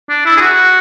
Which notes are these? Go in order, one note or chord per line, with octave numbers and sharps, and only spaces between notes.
D4
E4
G#4
F#4